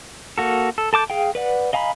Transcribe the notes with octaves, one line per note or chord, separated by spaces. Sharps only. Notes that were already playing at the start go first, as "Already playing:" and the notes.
A#3 F#4 A4
A4
A4 A5 D6 G6
G#4 F5 G5
B4 D5 F#5
D#5 F5 G#5 A#5 B5